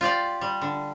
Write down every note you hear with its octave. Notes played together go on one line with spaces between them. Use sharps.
F4 G4 D5 F5
G3
D3